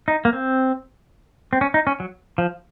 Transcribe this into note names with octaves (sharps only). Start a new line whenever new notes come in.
D#4
A#3
C4
C4
C#4
D#4
C#4
F#3
F3